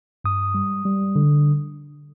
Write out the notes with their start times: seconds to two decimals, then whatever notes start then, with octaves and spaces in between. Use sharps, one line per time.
0.24 G2 D#6
0.54 G3
0.85 G3
1.16 D3